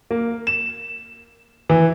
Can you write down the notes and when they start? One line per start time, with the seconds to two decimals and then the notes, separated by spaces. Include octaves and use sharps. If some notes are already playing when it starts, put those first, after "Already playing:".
0.11 A#3
0.47 E7
1.70 E3